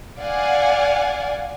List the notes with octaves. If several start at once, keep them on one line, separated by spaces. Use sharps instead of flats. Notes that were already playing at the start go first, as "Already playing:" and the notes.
D5 F5 F#5 G#5